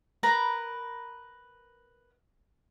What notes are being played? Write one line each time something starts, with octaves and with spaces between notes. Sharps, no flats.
A#4 B4 A#5 B5